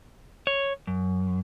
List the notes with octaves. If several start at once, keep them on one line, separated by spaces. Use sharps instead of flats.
C#5
F#2